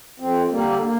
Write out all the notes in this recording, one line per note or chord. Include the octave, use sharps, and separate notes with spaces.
F2 C4
D3 G3 A#3
A#3